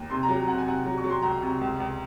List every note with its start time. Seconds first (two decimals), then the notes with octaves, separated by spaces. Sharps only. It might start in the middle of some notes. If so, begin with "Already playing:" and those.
Already playing: D#2
0.10 C3 C6
0.23 A#5
0.29 F#3
0.48 C3 F#5
0.58 G#5
0.66 C3 F#5
0.85 F#3
0.98 C#6
1.04 F#3
1.10 C6
1.22 C#2 A#5
1.42 C3
1.61 C#2
1.80 C#2